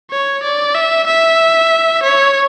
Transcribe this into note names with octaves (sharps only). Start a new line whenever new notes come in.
C#5
D5
E5
E5
C#5